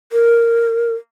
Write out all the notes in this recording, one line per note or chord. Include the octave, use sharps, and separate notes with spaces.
A#4